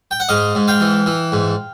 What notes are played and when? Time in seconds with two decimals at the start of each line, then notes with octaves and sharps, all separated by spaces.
0.11 G5
0.20 F#5
0.29 G#2 D#5 F5
0.55 G#2
0.68 F5 G5
0.80 E3
1.06 E3
1.32 G#2